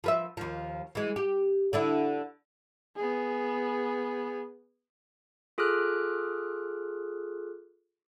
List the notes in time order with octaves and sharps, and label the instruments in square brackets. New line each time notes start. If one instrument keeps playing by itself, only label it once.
[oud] F3 B4 E5
D#2 F3
E3 G#3
G4
D3 D4 E4
[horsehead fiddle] B3 G#4
[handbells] F4 G#4 A4 D6 F6 F#6